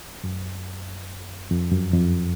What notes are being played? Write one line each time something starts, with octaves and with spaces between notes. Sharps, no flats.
F#2
F2
F#2
F2